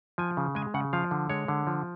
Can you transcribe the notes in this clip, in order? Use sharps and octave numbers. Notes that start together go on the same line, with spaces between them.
F3 G#5
C#3
G#3 G#5
C#3 F#5
F3 F5
D3
G#3 C#5
D3
F3